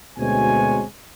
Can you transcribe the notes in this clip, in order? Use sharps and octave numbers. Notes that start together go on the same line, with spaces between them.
D2 B2 G#3 C4 C#5 G#5